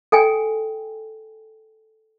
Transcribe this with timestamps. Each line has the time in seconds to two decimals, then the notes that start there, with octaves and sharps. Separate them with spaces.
0.12 A4 G5 G#5